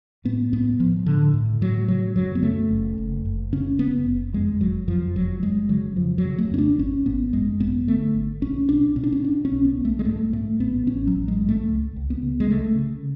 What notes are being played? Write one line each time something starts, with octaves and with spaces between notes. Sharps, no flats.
A2 B3
A2 B3
A2 F3
A2 D3
A2
A2 F#3
C#3 F#3
F#2 F#3
B3
C#3 A3
F#1
F#1
F#1
C#3 C#4
F#1 B3
F#1
F2 G#3
F#1 F#3
F2 F3
F#1 F#3
F#1 G#3
C#3 F#3
F2 F3
F#3
C#3
A3
F2 C#4
D4
G#1 C#4
G#1 B3
F#2 G#3
G#1 B3
D3 A3
G#1
B1 C#4
B2 D4
B2 C#4
D4
C#4
B2 D4
C#4
B1
B3
B1
A3
G#3
G#2 A3
G#2 A3
A1 B3
A1 C#4
F#3
A1
G#3
G#2
A3
C#2
C#2
B3
C#3
G#3
C#3 A3
C#3